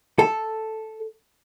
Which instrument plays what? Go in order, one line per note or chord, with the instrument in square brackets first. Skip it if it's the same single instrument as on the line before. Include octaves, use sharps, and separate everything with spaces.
[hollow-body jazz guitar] A4